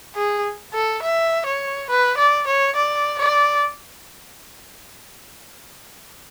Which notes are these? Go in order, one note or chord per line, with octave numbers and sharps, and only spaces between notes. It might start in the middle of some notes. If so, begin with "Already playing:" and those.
G#4
A4
E5
C#5
B4
D5
C#5
D5
D5